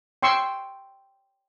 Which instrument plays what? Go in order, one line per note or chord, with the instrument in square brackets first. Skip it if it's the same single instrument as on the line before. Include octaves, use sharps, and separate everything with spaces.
[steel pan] G5 C6 C#6 E6